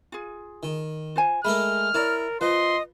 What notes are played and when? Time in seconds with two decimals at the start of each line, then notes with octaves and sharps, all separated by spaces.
0.12 F4 G#4
0.63 D#3
1.16 F4 C5 G#5
1.45 G#3 A3 A#4 B5 F6
1.94 E4 A#4 C#5 D5
2.41 F3 B4 D#5 C6